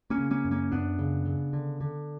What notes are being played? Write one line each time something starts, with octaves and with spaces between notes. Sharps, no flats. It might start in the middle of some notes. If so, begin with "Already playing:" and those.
A#3 C#4
C#3
A#3 C#4
F#2
A#3 C#4
F#2 B3 D4
C#3
C#3
D3
D3